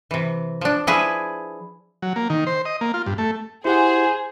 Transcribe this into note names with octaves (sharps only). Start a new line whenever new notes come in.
C3 E3
F3 D4
F3 E4 G#4 B4
F#3
A#3
D#3
C5
D#5
A#3
F4
G2
A3
E4 G4 G#4 C5 F#5